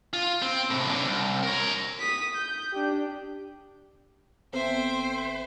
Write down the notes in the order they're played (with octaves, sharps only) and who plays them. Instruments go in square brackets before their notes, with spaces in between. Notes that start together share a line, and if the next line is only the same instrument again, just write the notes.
[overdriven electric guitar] F4
C4
A2 C3
F#2 D3
C2
A#4 C#5
[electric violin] D#6 B6
G6
D4 G4
[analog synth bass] G#1 [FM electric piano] B3 C4 A4 [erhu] C5 [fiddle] E5 G5